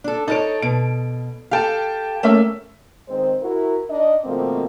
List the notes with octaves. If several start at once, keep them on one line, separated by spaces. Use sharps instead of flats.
D4 A4
D#4 A4 A#4 C#5 D7
B2 D7
G4 A4 F5 G5 A5
A3 A#3 C#4 E5
D#3 G#3 C4 C5
E4 F#4 A#4
D4 D#4 D#5
B2 D#3 F3 A3 A#3 C4